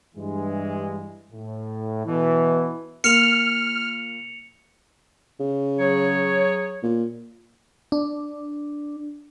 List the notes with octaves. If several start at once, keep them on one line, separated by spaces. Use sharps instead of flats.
G2 E3 G#3
A2
B2 E3
A#2 F6 C#7 F7
C#3
F#3 G#4 C#5
A#2
D4